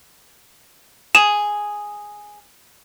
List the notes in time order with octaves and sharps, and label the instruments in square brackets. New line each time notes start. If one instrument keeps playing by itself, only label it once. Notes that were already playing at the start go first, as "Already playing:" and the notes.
[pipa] G#4 [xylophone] E7